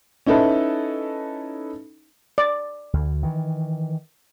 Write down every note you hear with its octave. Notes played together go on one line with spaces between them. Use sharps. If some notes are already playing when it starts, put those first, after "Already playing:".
C#4 D#4 E4 A4 B4
D5
D2
D#3 E3